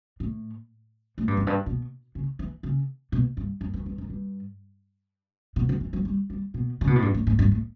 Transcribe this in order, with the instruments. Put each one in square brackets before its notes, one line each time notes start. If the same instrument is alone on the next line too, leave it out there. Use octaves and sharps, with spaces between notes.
[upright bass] A2
A2
G2
F#2
G2
B2
C#3
E3
C#3
B2
G2
F#2
F#2
G2
F#2
G2
B2
D3
E3
F#3
G3
G3
B2
C#3
B2
A2
G2
A2
A2
G2
A2